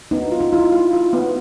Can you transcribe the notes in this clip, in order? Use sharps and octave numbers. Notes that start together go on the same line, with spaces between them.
B3 D#4
F4
D#4
E4 F4
F4
F4
B3